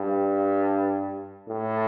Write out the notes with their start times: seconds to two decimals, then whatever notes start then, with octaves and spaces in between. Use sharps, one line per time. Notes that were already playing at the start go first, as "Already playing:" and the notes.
Already playing: G2
1.48 A2